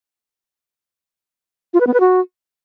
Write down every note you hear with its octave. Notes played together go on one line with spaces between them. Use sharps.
F4
B4
B3
B4
F#4